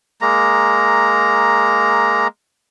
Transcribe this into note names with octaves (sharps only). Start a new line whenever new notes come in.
G#3 A#3 A#5